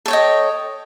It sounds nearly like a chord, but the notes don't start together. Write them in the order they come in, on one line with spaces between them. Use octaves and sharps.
A4 C#5 G5 D#5